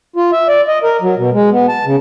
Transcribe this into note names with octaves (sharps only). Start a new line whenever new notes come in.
F4
E5
D5
D#5
A#4
F#3
B2
G#3
B3
A5
C#3